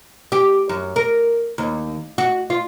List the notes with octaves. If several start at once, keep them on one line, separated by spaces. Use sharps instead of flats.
G4
F#2
A#4
D#2
F#4
F4